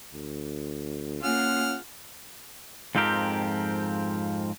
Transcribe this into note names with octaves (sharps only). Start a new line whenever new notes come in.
D2
A#3 C#4 F4 G#4 F#5 F6
F2 G#2 F3 C4 G4 A#4